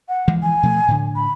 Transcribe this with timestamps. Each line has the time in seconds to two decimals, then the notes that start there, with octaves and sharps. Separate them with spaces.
0.09 F#5
0.28 E3 F3 G#3
0.43 G#5
0.63 B2 F3 A3
0.88 A2 D3
1.16 B5